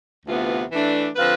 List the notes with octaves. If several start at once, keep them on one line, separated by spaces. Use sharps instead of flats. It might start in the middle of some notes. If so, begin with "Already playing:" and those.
D2 C3 E3 B3 F4
E3 A3 D4
D3 F3 C4 F4 B4